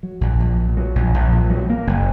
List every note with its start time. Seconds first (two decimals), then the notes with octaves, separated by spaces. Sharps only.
0.03 F#3
0.21 A#1
0.40 A#1
0.58 A#2
0.77 F#3
0.95 A#1
1.14 A#1
1.32 A#2
1.50 F#3
1.70 A#3
1.87 F#1